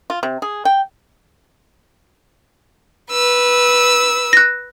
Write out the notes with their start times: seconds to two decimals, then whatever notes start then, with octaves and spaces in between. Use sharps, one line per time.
0.10 F4
0.23 C3
0.42 G#4
0.65 G5
3.11 B4 E6
4.33 F#6 A#6